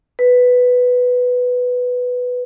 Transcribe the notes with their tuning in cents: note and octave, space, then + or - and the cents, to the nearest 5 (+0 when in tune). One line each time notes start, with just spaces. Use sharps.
B4 +5